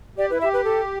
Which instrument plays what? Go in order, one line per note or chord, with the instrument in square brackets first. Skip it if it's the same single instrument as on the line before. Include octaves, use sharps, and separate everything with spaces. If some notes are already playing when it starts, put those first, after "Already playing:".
[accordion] G4 [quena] D5
[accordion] E4 [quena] B4
[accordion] G4 [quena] E5
[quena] B4
A4